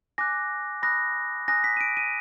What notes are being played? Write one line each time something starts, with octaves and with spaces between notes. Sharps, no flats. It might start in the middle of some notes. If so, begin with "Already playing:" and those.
G#5 D6 F#6 A#6
B5 D#6 F#6 A#6
G#5 D#6 F#6 A#6
B6
D#7
D7
D#7